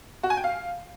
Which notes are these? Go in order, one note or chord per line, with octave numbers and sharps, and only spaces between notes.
F#4
G#5
G5
F5